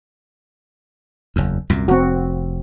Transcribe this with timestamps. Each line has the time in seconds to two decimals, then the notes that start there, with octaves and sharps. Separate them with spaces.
1.36 F#1 E2
1.70 C2 F#2 A#2
1.88 F1 C4 F#4